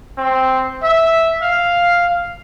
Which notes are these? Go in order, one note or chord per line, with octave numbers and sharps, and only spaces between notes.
C4
E5
F5